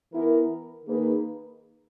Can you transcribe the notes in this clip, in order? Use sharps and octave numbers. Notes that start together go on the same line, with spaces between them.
E3 B3 E4 A#4
D#3 A#3 D#4 G#4 B4